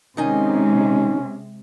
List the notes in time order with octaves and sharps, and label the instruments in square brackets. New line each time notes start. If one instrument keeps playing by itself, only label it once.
[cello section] C3 G#3 [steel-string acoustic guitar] D#3 D#4 G#5 [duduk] C#4